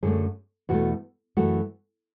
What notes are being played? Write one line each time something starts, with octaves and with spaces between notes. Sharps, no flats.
F#2 D3 F#3 A3 G#4
E2 B2 A3 F#4
F#2 E3 A3 F#4